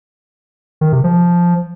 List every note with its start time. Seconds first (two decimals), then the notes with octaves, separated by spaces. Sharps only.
0.81 D#3
0.92 C3
1.04 F3